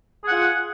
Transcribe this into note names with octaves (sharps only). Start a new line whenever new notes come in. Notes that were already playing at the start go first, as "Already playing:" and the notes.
F4 G#4 F#5